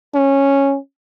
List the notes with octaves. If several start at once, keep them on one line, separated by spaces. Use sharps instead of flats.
C#4